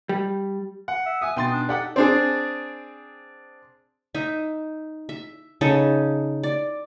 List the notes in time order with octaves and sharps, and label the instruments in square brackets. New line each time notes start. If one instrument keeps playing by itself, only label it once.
[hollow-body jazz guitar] G3
[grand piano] F#5
[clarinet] E5
[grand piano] E5 G#5 [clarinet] D#6
[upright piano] B2 D#4 [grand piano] G5 C6 A6
[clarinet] D4
[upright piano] D#4 A4 [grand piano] G4 F#5 G5 [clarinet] D5
[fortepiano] C4 D4 G#4
[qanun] D#4 E5
E5
C#3 D#4 A4
D5